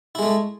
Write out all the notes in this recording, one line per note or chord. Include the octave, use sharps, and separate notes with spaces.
G#3 A3 E4